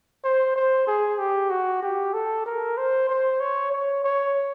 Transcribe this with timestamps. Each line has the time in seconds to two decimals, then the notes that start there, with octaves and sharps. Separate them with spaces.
0.24 C5
0.56 C5
0.87 G#4
1.19 G4
1.50 F#4
1.83 G4
2.14 A4
2.46 A#4
2.78 C5
3.09 C5
3.41 C#5
3.72 C#5
4.04 C#5